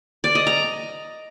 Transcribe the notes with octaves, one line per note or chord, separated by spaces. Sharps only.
D5
D#5
A#5